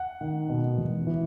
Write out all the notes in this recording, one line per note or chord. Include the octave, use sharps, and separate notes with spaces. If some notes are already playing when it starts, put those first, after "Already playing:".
Already playing: F#5
D#3
B2
E2
E3